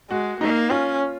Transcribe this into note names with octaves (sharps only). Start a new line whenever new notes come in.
G#3 F#4
A#3 D#4
C#4 F4